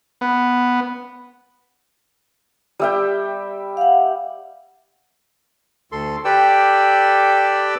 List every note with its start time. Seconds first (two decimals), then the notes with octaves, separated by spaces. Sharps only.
0.21 B3
2.80 G3 E5 G5
3.77 F5 F#5
5.92 D2 A4 C6
6.25 G4 A4 B4 D5 G5 E6